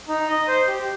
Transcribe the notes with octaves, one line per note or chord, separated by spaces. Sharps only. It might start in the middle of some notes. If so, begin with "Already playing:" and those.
D#4
D#5
C5
G4